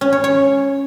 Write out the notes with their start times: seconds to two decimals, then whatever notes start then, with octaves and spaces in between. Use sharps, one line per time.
0.01 C#4
0.13 C#5
0.24 C#5